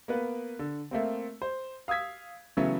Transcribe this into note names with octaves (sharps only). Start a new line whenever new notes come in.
A#3 B3 B4
D3
A3 A#3 C4
C5
F5 D#6 E6 G#6 B6
C#3 E3 F#3 A3 B3 C#4